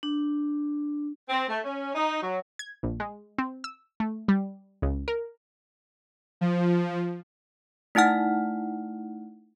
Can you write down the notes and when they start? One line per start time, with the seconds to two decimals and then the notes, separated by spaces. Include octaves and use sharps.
0.03 D4
1.29 C4
1.49 A3
1.63 C#4
1.95 D#4
2.22 F#3
2.59 G#6
2.83 A#1
3.00 G#3
3.38 C4
3.64 E6
4.00 A3
4.28 G3
4.82 C#2
5.08 A#4
6.41 F3
7.95 A3 D#4 E4 F#5 F6